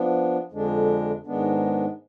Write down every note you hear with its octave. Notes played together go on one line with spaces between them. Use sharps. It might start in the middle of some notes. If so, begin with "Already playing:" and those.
Already playing: F3 B3 D4
F2 D3 G#3 D4
G#2 D#3 G#3 B3 D4